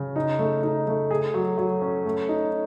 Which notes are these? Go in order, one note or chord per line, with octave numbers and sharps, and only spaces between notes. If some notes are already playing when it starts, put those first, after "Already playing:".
Already playing: C#3
D#4
A3
D#4
A3
G#4
F#3
F#3
C#4
A3
D#4